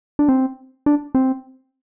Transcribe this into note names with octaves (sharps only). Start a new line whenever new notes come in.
D4
C4
D4
C4